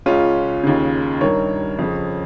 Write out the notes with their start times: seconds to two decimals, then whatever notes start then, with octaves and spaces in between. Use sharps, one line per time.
0.06 C#2 C#3 C#4 F4
0.63 D#2 C#3
1.21 G2 D#3 A#4 C#5
1.79 F2 C#3